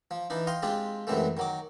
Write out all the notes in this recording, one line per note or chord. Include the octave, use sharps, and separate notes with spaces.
F3
E3 D4 D#4
D#5 F5 G5 C6
G#3 C4 D4 F4 G4
F#2 C3 E3 G#3 A3
D#3 F#3 D6